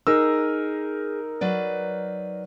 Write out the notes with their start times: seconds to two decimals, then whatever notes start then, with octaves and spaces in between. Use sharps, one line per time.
0.07 D#4 G#4 A#4 E6
1.41 F#3 B4 D5